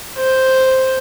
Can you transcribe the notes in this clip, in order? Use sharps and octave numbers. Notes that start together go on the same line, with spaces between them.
C5